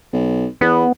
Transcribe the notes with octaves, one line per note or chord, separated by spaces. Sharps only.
B1
E2 B3